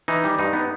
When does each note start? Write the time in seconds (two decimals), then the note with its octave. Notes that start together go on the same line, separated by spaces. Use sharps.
0.08 E3 D#4
0.24 G3
0.39 G2 D#4
0.53 B3